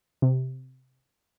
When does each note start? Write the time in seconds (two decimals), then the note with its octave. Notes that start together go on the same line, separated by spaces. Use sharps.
0.22 C3